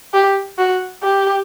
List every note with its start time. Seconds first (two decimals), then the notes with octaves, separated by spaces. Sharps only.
0.14 G4
0.58 F#4
1.03 G4